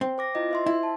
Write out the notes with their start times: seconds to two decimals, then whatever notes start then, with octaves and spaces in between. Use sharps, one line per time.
0.01 C4
0.18 C5 D6 A#6
0.35 E4 F4 D#5
0.51 C5 E5 C6
0.66 E4
0.83 A5